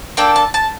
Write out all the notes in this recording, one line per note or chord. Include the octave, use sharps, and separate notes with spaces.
A#3 D4 A4 G5
A5
A5